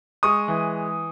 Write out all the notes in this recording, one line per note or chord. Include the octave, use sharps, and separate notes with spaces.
G#3 C#6 D#6
E3